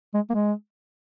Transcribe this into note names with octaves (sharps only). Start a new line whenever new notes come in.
G#3
A#3
G#3